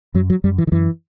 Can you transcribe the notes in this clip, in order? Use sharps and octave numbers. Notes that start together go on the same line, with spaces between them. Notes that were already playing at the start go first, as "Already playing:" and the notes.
F#2 F#3
F#3
F#2 G3
E3
D#3
F#2 E3